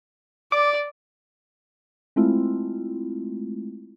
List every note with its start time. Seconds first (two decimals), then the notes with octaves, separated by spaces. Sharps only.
0.52 D5 D6
2.16 G#3 A3 C4 E4 F4